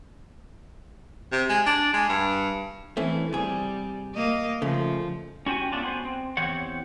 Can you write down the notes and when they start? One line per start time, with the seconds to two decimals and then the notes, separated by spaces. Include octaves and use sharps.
1.32 C3
1.49 G#3
1.66 D4
1.94 G#3
2.09 G2
2.97 E3 A3 C4 C#4
3.33 C3 G3 G#4
4.15 A#3 D#5
4.62 C#3 F3 A3
5.46 C#4 F#4 G4 G5 G#5
5.71 A3 B3 C#4 D4 F4
5.84 B3 F#4 C5 G#5
6.05 C4
6.37 E2 E3 C4 G4 C#5 F#5